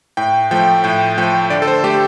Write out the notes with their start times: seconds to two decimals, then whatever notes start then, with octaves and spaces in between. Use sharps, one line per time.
0.17 A2 G5
0.51 F3 A3 G5
0.84 A2 G5
1.17 F3 A3 G5
1.50 D3 D5
1.62 A4
1.67 C5
1.84 A3 G4